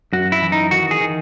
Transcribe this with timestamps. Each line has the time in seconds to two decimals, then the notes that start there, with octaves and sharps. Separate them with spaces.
0.13 F#2 F#4
0.32 E4
0.42 E3
0.52 D#4
0.71 D#3 F#4
0.91 G#4
1.01 D#3